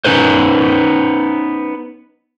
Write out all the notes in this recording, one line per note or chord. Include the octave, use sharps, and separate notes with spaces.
B3 C#4 D#4 B4 C5